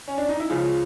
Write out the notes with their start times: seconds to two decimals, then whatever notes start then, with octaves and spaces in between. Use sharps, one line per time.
0.08 C#4
0.18 D4
0.29 D#4
0.40 E4
0.49 C#2 C#3 F3 F4